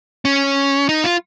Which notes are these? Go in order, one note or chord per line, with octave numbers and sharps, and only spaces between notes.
C#4
D#4
F4